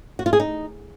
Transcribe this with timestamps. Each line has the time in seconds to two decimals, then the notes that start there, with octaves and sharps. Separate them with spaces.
0.19 F#4
0.26 F4
0.33 G#4
0.40 D#4